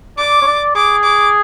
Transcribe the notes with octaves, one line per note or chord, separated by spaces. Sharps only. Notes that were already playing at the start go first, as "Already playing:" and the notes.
D5 D6
C#5
D5
G#4 D6
D6